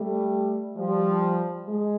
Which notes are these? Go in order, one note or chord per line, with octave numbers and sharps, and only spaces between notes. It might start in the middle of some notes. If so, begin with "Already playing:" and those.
Already playing: G3 A3
F3 G3
G#3